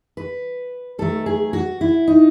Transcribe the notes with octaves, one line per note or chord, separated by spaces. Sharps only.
B4
D#3 F#3 A3 A4
G#4
F#4
E4
D#4